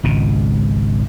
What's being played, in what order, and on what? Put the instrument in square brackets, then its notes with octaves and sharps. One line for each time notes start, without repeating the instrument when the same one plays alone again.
[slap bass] G#1 C#2 B2